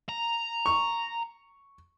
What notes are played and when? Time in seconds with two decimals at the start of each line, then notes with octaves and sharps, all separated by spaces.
0.09 A#5
0.66 C#6